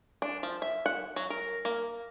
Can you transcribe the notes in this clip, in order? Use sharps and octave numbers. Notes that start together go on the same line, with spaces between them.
D4
F3
E5
F#5
F#3
A#4
A#3